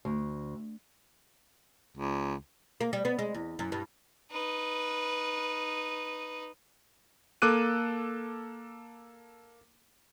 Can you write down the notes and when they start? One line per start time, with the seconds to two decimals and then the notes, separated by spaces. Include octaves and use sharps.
0.05 D2
1.96 C#2
2.81 A#3
2.93 G3
3.05 B3
3.19 G#3
3.34 E2
3.59 F#2
3.72 G2
4.32 D#4 B4
7.42 A#3 A4 D6 F#6 D#7